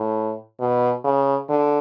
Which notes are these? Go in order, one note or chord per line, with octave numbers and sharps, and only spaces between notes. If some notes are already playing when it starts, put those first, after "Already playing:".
Already playing: A2
B2
C#3
D3